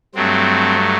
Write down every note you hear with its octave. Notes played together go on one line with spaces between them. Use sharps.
G2 F#3 A3 C4